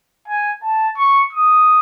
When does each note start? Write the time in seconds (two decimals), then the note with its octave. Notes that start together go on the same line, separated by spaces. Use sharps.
0.28 G#5
0.63 A5
0.97 C#6
1.33 D#6